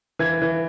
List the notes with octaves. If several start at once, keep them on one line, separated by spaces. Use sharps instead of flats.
E3 G#6
E3